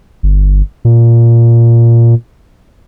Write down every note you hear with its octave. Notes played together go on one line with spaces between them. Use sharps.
G1
A#2